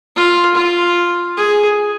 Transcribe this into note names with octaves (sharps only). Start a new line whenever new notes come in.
F4
F4
G#4